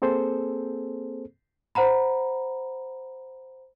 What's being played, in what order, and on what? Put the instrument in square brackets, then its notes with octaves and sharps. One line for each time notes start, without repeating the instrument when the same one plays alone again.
[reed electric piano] A#3 C4 G#4 A4 C5
[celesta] C5 F#5 A#5 B5